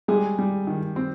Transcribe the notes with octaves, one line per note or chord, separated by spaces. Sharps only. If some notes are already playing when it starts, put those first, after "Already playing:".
G3 G#3 G#4
G3
D#3
C4